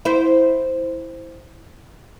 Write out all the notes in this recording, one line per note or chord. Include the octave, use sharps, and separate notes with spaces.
E4 C5